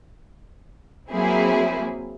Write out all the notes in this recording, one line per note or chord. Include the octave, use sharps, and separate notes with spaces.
F#3 A#3 C4 E4 G#4